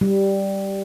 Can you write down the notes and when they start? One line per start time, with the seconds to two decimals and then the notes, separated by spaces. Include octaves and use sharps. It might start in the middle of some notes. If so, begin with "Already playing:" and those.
0.01 G3